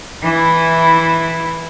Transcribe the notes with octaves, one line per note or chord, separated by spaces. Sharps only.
E3 E4